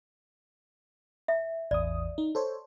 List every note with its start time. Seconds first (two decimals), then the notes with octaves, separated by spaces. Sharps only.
1.28 E5
1.71 A1 E2 D5 D#6
2.18 D#4
2.35 A4 C5 C#5